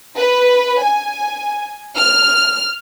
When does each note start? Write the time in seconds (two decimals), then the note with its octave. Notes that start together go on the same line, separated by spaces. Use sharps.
0.17 B4
0.83 G#5
1.96 F6